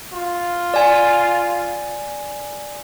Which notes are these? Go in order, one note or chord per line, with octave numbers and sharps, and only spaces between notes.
F4
D5 G#5